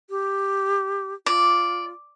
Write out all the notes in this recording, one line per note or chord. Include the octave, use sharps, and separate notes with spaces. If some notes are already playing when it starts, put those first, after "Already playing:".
G4
F4 D5